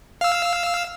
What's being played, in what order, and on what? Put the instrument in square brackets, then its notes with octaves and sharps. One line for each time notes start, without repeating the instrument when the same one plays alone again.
[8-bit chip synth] F5 E6